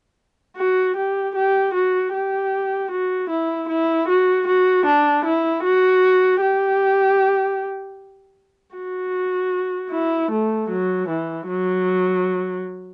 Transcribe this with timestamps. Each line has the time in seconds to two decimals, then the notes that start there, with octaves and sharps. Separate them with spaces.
0.57 F#4
0.96 G4
1.35 G4
1.74 F#4
2.14 G4
2.91 F#4
3.30 E4
3.69 E4
4.08 F#4
4.47 F#4
4.86 D4
5.25 E4
5.64 F#4
6.41 G4
8.76 F#4
9.91 E4
10.31 A3
10.69 F#3
11.09 E3
11.48 F#3